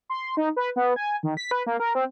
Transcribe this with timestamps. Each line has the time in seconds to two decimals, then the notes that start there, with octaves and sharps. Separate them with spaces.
0.10 C6
0.37 D#4
0.56 B4
0.76 B3
0.96 G#5
1.23 D#3
1.37 B6
1.51 B4
1.66 A#3
1.80 A#4
1.95 C4